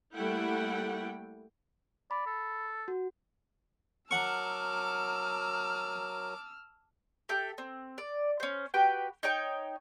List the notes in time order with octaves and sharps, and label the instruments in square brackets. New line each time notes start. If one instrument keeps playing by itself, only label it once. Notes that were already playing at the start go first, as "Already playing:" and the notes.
[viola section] G3 A3 A#3 E4 F#5 G5
[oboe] D5 [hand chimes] B5
[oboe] A4
[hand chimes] F#4
[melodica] F#3 A#4 [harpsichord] F#5 C#6 [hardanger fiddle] A5 D6 [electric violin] E6 F6
[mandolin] G4 A4 E5 G5
C4
D5
C#4 C5
F#4 G4 B4 G5
D#4 C#5 G5